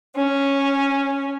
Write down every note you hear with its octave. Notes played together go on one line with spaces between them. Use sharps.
C#4